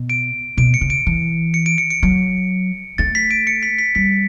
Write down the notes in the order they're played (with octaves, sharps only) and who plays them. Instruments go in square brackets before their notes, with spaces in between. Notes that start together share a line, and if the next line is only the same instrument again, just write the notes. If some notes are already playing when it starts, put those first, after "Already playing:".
Already playing: [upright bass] B2
[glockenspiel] D7
[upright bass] B2 [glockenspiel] D7
[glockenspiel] C#7
[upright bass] C#3
[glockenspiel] D7
[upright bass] E3
[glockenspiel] C#7
D7
C#7
C#7
[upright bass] F#3
[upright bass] A3 [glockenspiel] A6
[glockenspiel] B6
D7
C#7
B6
B6
[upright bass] G3 [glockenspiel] B6